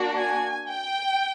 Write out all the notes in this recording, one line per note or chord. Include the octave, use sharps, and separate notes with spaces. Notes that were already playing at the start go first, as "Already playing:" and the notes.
Already playing: A#3 D4 F#4
G#5
G5